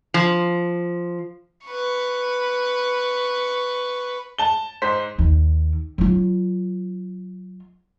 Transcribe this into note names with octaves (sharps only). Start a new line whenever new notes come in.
F3
B4 C#6
A5 G7
G#2 C5 B6
D#2
F#3 F4